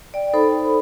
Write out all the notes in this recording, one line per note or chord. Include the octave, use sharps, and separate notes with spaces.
D5 G5
D#4 A4 C5 B5